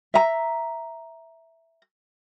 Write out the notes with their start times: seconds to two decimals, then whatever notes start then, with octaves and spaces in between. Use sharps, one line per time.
0.14 E5 A#5